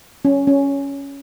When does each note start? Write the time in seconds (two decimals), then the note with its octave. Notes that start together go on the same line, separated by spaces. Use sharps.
0.25 C#4
0.47 C#4